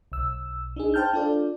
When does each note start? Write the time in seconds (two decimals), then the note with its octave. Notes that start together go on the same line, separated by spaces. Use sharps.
0.12 B1 E6
0.76 D4 D#4 G#4
0.94 C5 G5 A5 F6 G6
1.13 D4 F4 A4 D5